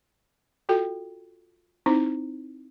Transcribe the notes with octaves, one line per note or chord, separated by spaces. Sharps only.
F4 F#4 A4 G5
C4 D#4 E4 C5